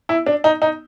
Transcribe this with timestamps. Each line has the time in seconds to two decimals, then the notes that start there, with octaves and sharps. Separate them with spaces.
0.09 E4
0.26 D4
0.44 D#4
0.62 D#4